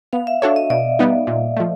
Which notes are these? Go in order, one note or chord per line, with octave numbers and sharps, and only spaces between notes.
B3 F5
E5
D4 F#4 A4 C#5 E5
D#5
B2 D5
G3 B3 D#4
A#2
F3 A3